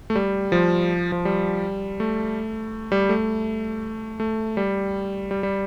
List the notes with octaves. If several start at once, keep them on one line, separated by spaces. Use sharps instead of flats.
A3
G3
F3
F3
G3
A3
G3
A3
A3
G3
G3
G3